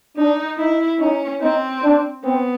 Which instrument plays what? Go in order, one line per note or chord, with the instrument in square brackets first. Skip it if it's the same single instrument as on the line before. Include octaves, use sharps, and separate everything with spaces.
[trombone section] D4 [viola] D#4
[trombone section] D#4 [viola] E4
[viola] C#4 [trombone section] D#4
[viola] C4 [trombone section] D#4
[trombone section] D4
[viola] B3 [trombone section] C4